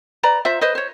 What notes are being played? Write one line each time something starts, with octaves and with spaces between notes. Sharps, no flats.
B4 D5 A#5
F4 C5 E5
B4 C5 D#5
C5 C#5